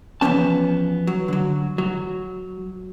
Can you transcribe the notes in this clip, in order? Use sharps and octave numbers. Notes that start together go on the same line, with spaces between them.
E2 G2 F3 B3 C#4 A5
F#3
D3 F#3
F#3